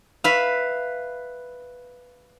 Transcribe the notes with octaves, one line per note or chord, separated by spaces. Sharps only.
B4 E5 F5